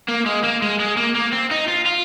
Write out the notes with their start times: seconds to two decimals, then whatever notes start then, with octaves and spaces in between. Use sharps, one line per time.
0.09 A#3
0.26 G#3
0.44 A#3
0.62 G#3
0.80 G#3
0.97 A#3
1.15 A#3
1.32 C4
1.51 D#4
1.68 F4
1.86 F4